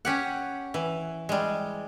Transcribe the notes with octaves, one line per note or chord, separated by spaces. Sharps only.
C#4 G4 F#5
E3
G3 G#3